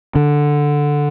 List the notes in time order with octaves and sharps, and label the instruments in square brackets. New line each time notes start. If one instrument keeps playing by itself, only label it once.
[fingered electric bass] D3